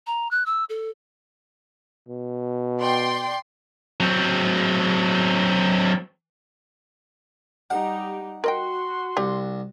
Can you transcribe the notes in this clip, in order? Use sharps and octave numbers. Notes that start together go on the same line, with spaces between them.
A#5
F#6
E6
A4
B2
D5 G5 C6
F#3 C4
G3 D#4 G4 F#5
F#4 A#4 D#5 G5 C6
C2 G4